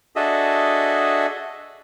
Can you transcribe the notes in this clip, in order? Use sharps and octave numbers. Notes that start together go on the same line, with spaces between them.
D4 F#4 G#4 A4 D#5 E5